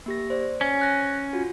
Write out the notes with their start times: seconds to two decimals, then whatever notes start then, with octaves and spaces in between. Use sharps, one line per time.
0.06 A#3 G4 A#6
0.30 C5 D5
0.61 C#4
0.81 F#6 A#6
1.33 F4 F#4